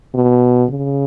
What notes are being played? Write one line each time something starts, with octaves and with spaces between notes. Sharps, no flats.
B2
C#3